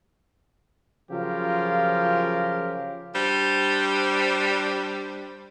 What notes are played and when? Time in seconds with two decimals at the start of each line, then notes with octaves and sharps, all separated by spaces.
1.11 C#3 F3 F#3 F4 G4 A#4
3.15 G3 D4 C5